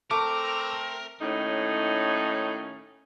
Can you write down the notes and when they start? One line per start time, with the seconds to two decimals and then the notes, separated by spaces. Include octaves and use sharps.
0.11 A3 C4 A#4 D6
1.20 D#2 A2 C#4 D#4